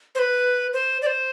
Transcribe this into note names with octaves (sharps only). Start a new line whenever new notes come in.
C5
B4
C5
D5
C5